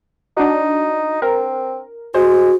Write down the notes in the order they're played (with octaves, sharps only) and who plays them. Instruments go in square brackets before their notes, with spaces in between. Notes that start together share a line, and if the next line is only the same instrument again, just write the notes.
[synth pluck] D4 F#4 [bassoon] D#4
[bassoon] C4 [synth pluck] A#4
[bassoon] G#3 [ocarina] F#4 [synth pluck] C5